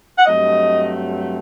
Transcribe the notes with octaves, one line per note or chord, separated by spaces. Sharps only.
F#5
G2 F#3 A3 C4 D#5